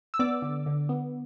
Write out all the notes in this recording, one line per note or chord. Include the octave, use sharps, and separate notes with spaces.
E6
B3 D5 D6
D3
D3
B3